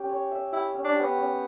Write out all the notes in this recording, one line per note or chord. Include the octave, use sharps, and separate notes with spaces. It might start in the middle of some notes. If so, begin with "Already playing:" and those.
Already playing: C#4 G4
C#5
E5
E4 G4
C#4
D4
G4
B3
C#4